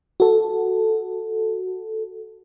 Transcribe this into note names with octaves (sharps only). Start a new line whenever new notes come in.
F#4 A4